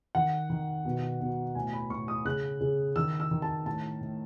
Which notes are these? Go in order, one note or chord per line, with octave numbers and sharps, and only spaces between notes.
D#3 F#5
D#3
B2
B2
A2 G#5
B5
A2 C#6
D#6
C#3 F#6
C#3
D#3 E6
E6
D#3
A5
A2 A5
A2